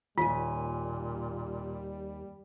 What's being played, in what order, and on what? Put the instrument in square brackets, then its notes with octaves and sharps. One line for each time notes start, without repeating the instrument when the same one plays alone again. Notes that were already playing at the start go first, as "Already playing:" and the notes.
[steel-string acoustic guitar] D#2 G#5 [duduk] A#2 [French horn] G3 [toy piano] F4